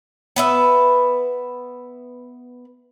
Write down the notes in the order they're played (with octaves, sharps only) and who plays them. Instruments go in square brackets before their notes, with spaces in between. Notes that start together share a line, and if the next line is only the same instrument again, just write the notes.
[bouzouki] B3 B4 E5